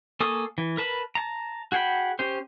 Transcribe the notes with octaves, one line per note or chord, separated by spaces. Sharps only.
A#3 A4 G#5 C#6 D#6
E3
A#4 B4 A5 B5
A5 A#5
F#4 G#4 F#5 G5 B5
C#4 G4 C5